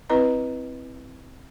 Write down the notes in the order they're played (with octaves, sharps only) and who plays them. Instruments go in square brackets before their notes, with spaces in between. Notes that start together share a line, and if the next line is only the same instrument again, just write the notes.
[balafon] C4 E4 B4 D#5 A#5